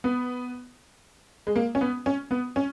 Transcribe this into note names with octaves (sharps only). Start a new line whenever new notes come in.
B3
G#3
A#3
C#4
B3
C#4
B3
C#4